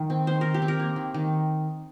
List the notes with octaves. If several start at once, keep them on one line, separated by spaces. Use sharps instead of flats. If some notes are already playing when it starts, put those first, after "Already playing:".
Already playing: D#3
C4
D#3 C5
D#3 A#4
G4
C4
A#4
A#3
D#3
D#3